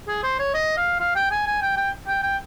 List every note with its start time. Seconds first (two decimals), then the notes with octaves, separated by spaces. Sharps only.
0.08 G#4
0.23 C5
0.39 C#5
0.54 D#5
0.77 F5
1.00 F5
1.16 G5
1.31 G#5
1.46 G#5
1.62 G5
1.77 G5
2.08 G5
2.23 G5